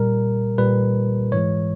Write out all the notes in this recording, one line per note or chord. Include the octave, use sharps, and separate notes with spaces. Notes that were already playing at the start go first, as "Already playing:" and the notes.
Already playing: A#2 G3 A#4
A#2 G3 B4
G#2 E3 G#3 C#5